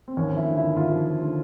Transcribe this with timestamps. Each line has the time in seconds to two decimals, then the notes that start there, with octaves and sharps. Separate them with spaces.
0.08 C4
0.17 D#2 C#4
0.32 F3 E4
0.47 D3
0.57 E4
0.62 D#2
0.77 D#2 F4
0.92 F3
1.06 F3
1.22 D3